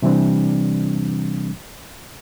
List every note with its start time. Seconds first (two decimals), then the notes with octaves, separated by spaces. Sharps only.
0.02 C3 E3 G3 C4 D4